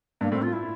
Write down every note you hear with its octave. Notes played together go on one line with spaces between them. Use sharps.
G2 A#3
A2 C4
F4
E4